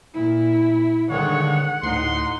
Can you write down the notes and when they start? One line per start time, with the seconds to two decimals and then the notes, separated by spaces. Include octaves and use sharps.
0.14 A#2 E4
1.10 G2 D3 D#3 G#3 C#5 F#5
1.83 D2 A2 D#4 C6